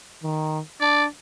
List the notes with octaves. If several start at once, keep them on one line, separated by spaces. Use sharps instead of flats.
D#3
D4 D5